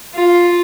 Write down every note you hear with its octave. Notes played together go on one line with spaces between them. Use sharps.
F4